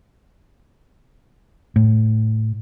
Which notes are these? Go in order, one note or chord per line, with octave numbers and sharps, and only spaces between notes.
A2